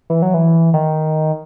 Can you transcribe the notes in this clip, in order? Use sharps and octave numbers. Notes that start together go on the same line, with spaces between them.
E3
F#3
E3
D#3